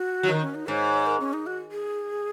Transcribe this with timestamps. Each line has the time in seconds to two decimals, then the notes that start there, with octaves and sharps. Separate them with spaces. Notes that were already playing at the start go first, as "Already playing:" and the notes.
Already playing: F#4
0.23 F#3
0.29 D#3 D#4
0.42 C#4
0.55 D#4
0.68 G#2 C#5
1.06 A#4
1.20 C#4
1.33 D#4
1.47 F#4
1.72 G#4